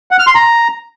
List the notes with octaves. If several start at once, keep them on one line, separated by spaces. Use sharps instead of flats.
F#5
F6
C6
A#5